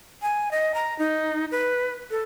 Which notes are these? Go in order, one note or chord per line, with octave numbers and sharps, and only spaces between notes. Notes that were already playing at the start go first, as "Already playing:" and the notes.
G#5
D#5
A#5
D#4
B4
A4